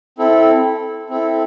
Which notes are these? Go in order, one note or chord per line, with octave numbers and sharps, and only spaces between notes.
C4 E4 A4
C4 E4 A4